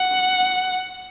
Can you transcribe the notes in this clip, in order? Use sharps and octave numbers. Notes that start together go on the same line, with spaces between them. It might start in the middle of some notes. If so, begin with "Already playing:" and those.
Already playing: F#5